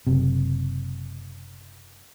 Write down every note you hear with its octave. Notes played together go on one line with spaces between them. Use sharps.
F#1 C3